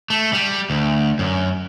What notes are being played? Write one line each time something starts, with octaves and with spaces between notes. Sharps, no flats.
A3
G3
D2
F#2